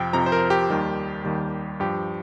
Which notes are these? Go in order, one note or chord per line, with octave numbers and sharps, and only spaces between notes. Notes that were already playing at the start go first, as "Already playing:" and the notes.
Already playing: F2 C3 F3 G5
F2 C3 F3 A#5
C5
A#4
G4
D#2 D#3 G3
D#2 D#3 G3
G2 F3 G4